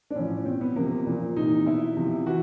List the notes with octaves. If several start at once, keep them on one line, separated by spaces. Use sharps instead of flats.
D4
A2 F3 C#4
B2 C4
B3
C3 F3 A#3
A#2 F3
C3 E3 D#4
B2 E4
C3 F3
E3 F#4